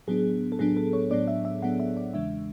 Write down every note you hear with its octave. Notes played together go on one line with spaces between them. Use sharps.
A2 F#3 B3 D4 G#4
A4
A2 F#3 B3 D4 G#4
A4
C#5
A2 F#3 B3 D4 D5
E5
E5
A2 F#3 B3 D4 F#5
E5
D5
E2 C#3 E3 G#3 D4 E5